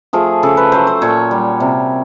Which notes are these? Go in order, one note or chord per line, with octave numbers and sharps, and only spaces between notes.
F3 A3 G#4
C#3 A4
B4
F#3 A3 C5
C5
A#2 C#5
G3
C3